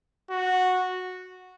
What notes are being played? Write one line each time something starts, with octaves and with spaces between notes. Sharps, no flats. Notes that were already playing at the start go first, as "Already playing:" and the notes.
F#4